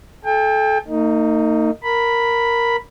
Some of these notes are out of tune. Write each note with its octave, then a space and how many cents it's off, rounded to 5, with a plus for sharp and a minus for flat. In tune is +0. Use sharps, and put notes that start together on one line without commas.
A4 -25 G5 +30
A#3 -45 D#4 +0
A#4 +0 B5 +0